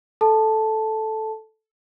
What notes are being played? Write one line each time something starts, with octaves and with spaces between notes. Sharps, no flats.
A4 A5